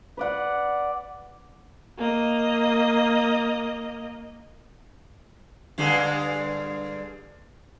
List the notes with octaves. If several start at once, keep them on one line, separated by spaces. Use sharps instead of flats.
B4 D5 F#5
A#3 D#5
G2 D3 G#3